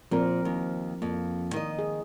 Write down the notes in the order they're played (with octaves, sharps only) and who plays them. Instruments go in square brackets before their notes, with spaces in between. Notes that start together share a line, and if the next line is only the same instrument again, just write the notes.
[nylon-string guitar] A#2 [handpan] F3 C4 A#4
[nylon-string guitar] D#2
[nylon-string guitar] F2 [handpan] A#3
[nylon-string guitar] D#3 D#5
[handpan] G#4